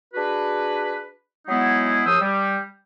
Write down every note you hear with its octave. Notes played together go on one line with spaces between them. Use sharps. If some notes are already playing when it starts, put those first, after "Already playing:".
D4 F#4 G#4 B4
F#3 G#3 B3 D#4 E4 G#4
F#2 F3 G4 C5 D#6 E6
G3